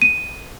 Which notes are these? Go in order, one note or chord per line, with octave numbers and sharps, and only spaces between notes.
D#7